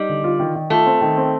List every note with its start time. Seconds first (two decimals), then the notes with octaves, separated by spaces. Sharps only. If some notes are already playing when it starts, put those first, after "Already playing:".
Already playing: G3 D#4
0.09 D3
0.24 F4
0.40 D#3
0.55 D#3
0.70 A3 F4
0.86 C4
1.01 D#3
1.17 C4